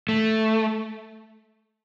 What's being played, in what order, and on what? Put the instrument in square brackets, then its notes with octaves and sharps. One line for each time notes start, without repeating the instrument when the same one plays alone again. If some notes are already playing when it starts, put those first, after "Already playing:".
[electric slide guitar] A3